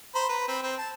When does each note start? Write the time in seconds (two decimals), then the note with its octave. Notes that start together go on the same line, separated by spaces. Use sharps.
0.15 C5 A#5 B5
0.29 B4 A#5
0.48 C4 B5
0.63 C4
0.78 A5